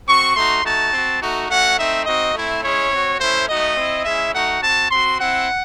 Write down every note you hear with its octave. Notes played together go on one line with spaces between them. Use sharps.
C4 F#4 C#6
A3 D#4 F#4 C6
A3 D#4 F#4 A5
C4 F#4
A3 D#4 F#4
A3 C#4 F#4 F#5
A3 C4 D#4 E5
C4 D#4 F#4 D#5
A3 C4 E4
G#3 C#4 E4 C#5
C4 F#4
A3 C#4 E4 C5
A3 D#4 F#4 D#5
C4 E4
G#3 C#4 E4 E5
A3 D#4 F#4 F#5
C4 F#4 A5
C4 F#4 C6
C4 E4 F#5